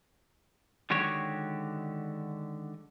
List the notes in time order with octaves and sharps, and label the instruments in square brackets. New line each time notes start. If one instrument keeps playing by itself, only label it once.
[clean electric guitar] D3 D#3 G#3 F#4 G4 C#5